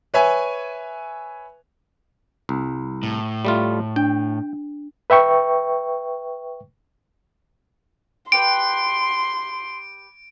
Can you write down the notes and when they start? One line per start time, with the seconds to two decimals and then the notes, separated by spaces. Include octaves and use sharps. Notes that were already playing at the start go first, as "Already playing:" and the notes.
0.14 B4 C#5 E5 G#5
2.49 C2
3.03 A2
3.45 G3 A3 F4
3.96 D4 G5
5.10 B4 E5 G5 C#6
8.32 G4 B4 G5 C6 D7